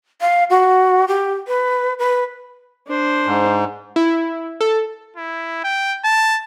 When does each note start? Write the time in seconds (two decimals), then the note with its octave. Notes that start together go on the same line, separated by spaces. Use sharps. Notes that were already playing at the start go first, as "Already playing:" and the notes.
0.21 F5
0.50 F#4
1.08 G4
1.47 B4
1.99 B4
2.87 D4 C5
3.26 G#2
3.96 E4
4.61 A4
5.16 E4
5.64 G5
6.04 A5